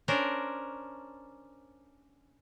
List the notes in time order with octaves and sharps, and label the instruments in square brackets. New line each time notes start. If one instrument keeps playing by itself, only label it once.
[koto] C#4 D4 A#4 C5